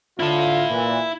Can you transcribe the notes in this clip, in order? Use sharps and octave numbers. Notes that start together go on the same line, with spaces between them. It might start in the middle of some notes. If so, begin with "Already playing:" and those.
D3 E4 F4 A5
A#2 E3